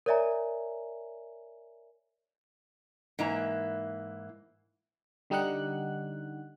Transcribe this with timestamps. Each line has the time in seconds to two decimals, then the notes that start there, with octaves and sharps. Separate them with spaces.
0.06 A#4 C#5 D5 E5 G#5 A#5
3.19 G#2 E3 A#3 E4 A#5
5.30 D3 G3 D#4 G4 F#5 F#6